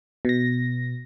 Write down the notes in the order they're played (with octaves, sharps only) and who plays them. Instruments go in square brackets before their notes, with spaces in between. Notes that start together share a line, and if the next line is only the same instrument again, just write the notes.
[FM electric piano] B2 A#6